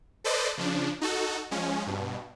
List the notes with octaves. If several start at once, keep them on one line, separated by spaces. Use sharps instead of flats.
A4 B4 C5 D5 D#5
C#3 F3 D4
D#4 F#4 A4
F3 G#3 C#4
G2 B2